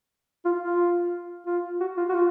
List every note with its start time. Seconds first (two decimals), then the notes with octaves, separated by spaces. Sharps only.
0.45 F4
0.62 F4
1.46 F4
1.80 F#4
1.97 F4
2.09 F#4
2.14 F4